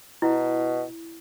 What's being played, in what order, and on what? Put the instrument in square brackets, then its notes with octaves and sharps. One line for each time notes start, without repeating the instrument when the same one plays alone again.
[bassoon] B2 [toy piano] E4